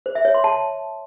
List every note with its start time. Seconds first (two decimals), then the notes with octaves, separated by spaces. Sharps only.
0.06 C5
0.15 E5
0.25 C#5
0.34 C6
0.44 A5